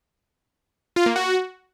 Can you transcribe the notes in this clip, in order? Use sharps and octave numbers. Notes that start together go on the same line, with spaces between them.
F4
A#3
F#4